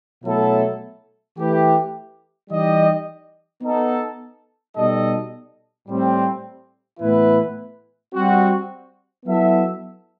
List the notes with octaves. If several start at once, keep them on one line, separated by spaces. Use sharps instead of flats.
B2 F#3 A3 E4 A4
E3 A3 E4 G4 B4
E3 G3 D#4 G4 D#5
B3 D#4 A4
B2 G3 D#4 A4 D#5
A2 G3 C4
A2 E3 B3 E4 B4
G3 C4 F#4
F#3 B3 E4 A4 E5